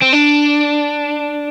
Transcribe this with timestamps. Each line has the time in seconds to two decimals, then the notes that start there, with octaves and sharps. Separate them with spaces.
0.02 C4
0.13 D4